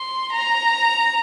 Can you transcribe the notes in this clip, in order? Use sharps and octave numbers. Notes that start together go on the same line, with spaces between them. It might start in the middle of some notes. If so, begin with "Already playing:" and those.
Already playing: C6
A#5